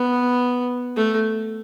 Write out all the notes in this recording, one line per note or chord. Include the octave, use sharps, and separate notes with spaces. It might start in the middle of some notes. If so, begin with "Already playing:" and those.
Already playing: B3
A3